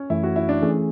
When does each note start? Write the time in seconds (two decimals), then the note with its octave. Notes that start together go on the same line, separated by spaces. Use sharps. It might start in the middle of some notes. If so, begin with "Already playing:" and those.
Already playing: C#4
0.10 F#2 E3 A3 E4
0.23 F#4
0.36 E4
0.49 D4
0.62 E3 A3 C#4 G#4